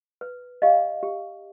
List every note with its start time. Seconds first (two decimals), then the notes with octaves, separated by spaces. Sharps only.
0.21 B4
0.62 G4 D#5 F5
1.03 G4